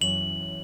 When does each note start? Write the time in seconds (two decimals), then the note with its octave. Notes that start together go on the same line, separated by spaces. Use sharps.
0.01 F#2 E3 C#4 F#4 F#7